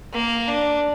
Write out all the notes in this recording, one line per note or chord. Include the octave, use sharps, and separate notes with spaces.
A#3
D4